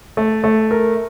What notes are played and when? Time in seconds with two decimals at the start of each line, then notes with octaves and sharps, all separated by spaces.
0.17 A3
0.44 A3
0.71 A#4